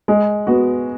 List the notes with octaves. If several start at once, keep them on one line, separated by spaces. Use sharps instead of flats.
G#3
B3 F#4